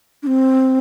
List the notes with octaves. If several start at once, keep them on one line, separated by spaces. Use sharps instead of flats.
D4
C4